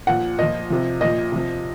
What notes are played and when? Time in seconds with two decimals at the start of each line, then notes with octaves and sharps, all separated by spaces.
0.07 A#2 F3 F#5
0.38 A#2 F3 D#5
0.70 C3 F3
1.01 A#2 F3 D#5
1.32 C3 F3